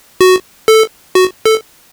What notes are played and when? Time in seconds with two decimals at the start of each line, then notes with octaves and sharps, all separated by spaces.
0.21 F#4
0.68 A4
1.15 F#4
1.45 A4